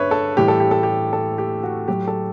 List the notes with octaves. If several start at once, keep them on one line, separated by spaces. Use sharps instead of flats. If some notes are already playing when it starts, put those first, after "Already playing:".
Already playing: G2 B4 C#5 E5
A4
A2 E3 G3 G4
A4
G4
A4
G4
A4
G4
F#4
A2 F#3 G4
A4